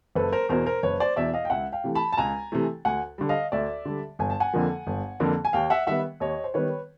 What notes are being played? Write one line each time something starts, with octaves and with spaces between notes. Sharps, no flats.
F#1 A4 B4
A#4 C5
E2 B2 A#4 C5
A#4 C5
F#1 B4 C#5
C5 D5
E2 B2 D5 E5
D#5 F5
G5
C#2 E5 F#5
F5 G5
C3 E3 A3
A5 B5
A5
C#2 G#5 A#5
C3 E3 A3
D2 F#5 G#5
D3 G3
D#5 F5
D2 D5 E5
D3 G3
G1 G#5
A5
F#5 G#5
F2 D3 F3 A#3
G1
F2 D3 F3 A#3
G#5
D#2 F5 G5
E5 F#5
D#3 G3 B3 E5 F#5
D#2 C#5 D#5
C5
D#3 G3 B3 B4 C#5